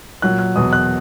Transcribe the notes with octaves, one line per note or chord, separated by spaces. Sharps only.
A#2 F#3 F#6
F#6
E2 B2 F#3 D#6
F#6